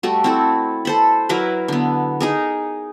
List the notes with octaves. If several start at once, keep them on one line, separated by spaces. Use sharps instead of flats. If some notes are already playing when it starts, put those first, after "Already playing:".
G3 A3 F#4
C4 E4 A4
A4 C5 B5
F#3 E4 A#4 B4
D3 B3
D#4 G#4 A#4